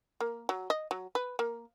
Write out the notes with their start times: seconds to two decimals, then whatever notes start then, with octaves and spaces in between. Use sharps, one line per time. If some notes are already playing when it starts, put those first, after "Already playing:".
0.21 A#3
0.49 F#3
0.70 D#5
0.91 F#3
1.15 B4
1.39 A#3